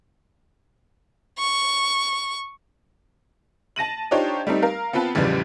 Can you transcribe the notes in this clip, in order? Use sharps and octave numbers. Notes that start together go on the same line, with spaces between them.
C#6
A5 A#6 D#7 F#7
D4 D#4 F4 G4 C5 C#5
G3 A3 C4 D#4
A#4 F5
B3 C4 F4 B4 A5
A1 E2 A2 C#3 F3 G3